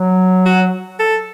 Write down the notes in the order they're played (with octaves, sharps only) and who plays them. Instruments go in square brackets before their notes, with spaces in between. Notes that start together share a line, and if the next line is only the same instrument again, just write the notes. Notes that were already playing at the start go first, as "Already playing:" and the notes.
Already playing: [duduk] F#3
[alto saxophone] F#4
A4